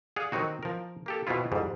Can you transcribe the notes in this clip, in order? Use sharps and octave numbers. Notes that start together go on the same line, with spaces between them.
G#4 D5 F5 F#5
D#3 F#3 C4 D#4 F#4
F3 A#4
A#3 G4 A4
B2 B3 C4 E4 F4
F2 G#2 G3